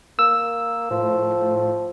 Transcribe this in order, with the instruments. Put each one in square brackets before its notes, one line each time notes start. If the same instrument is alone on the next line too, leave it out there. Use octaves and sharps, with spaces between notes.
[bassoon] A#3 [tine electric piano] E6
[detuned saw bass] A2 [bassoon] F3